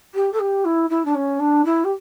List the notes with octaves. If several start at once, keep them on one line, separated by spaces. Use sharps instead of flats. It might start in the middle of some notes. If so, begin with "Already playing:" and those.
G4
A4
G4
E4
E4
D4
C#4
D4
E4
G4